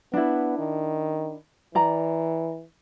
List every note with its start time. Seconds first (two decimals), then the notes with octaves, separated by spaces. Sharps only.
0.13 B3 D4 E4
0.59 D#3
1.75 E3 D5 A#5